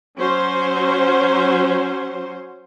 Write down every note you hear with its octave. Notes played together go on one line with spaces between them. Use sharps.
F#3 C#4 C5